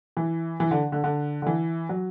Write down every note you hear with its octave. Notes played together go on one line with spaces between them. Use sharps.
E3
E3
D3
D3
D3
D3
E3
F#3